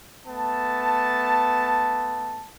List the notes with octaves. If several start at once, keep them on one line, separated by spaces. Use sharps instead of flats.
A3 B3 A5